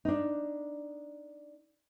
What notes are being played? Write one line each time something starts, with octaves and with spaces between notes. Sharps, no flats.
D4 D#4